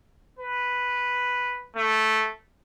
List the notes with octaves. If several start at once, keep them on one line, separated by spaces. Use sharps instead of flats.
B4
A3